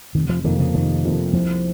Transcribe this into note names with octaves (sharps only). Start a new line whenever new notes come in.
F1 D#3
F3
F2 C3 D#3 F3 A#3
C#3
F1 D#3
F2 C3 F3 A#3
C2 F3